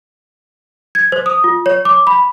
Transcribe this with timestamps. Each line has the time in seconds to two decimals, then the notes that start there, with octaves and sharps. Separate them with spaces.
0.95 G#6
1.12 C5
1.26 D#6
1.44 F4
1.66 C#5
1.85 D6
2.07 B5